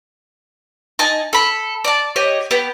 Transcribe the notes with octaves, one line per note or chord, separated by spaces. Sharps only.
D#4 D#5 G#5 A5
A4 B5
D5 A5
G4 C#5 D#5
B3 G4